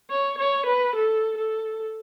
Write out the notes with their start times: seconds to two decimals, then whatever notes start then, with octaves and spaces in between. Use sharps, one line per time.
0.10 C#5
0.38 C#5
0.66 B4
0.95 A4
1.38 A4